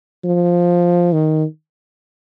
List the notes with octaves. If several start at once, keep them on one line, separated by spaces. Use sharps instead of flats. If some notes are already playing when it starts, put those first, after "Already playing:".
F3
D#3